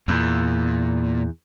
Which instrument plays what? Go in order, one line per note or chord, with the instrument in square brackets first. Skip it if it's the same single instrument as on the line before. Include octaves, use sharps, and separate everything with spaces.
[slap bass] E2 [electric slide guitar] A#2